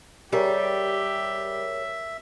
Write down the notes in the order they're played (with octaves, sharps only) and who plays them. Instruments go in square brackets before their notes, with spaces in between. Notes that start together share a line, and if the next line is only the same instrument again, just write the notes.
[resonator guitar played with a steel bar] G3 [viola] G4 [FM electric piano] G#4 A#4 C#5 [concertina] E5